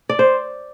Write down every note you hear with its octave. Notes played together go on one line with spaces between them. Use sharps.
D5
C5